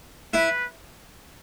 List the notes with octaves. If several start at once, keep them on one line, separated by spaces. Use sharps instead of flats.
E4 B4